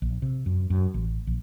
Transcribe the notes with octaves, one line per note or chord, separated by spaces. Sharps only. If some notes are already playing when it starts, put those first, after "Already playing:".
A#1
C3
F#2
F#2
A1
A#1